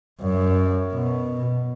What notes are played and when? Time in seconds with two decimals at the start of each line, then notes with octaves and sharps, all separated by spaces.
0.21 F#2
0.92 B2